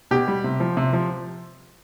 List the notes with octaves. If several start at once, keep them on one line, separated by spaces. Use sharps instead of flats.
B2 G4
G3
C3
F3
C3
F3